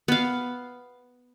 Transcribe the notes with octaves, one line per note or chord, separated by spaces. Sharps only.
B3 F5